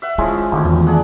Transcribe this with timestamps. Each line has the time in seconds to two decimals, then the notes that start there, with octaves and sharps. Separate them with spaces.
0.02 E5 F#5
0.18 F3 G#3 C#4 E4 F4
0.52 G#1 D2 D#3
0.65 E2
0.87 D4 G#4 F#5